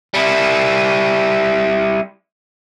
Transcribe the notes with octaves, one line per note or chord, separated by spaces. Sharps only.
G3 E4